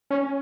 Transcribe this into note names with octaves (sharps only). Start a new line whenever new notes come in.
C#4